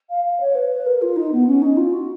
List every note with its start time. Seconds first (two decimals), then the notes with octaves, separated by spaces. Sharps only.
0.09 F5
0.24 F5
0.40 C#5
0.55 B4
0.70 B4
0.86 A#4
1.01 F4
1.16 D#4
1.32 B3
1.46 C#4
1.61 D#4
1.76 F4
1.92 F#4